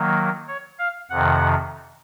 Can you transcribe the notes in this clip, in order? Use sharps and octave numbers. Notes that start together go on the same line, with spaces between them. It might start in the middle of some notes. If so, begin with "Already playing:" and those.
Already playing: D#3 F#3 A#3
C#5
F5
F2 C3 D#3 F#5